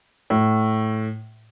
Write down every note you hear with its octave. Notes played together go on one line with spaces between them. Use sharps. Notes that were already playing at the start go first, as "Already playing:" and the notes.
A2